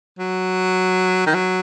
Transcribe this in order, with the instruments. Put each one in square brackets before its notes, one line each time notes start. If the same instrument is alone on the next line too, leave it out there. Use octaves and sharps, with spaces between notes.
[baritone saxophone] F#3
D#3
F#3